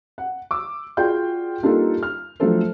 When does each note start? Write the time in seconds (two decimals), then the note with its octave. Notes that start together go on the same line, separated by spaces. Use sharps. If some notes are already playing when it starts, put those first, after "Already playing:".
0.18 F#5
0.51 D6 E6
0.97 F4 F#4 G#4 D5 G5 G6
1.62 G3 A#3 D4 D#4 F4 A4
2.03 F6
2.40 F3 F#3 A3 D4 A4 C5